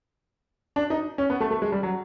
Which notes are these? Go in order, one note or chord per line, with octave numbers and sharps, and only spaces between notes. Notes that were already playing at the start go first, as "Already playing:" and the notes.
D4
D#4
C#4
B3
A3
A3
G#3
G3
F#3